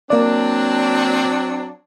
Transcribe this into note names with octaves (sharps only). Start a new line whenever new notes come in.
F#3 A#3 C4 D4 D5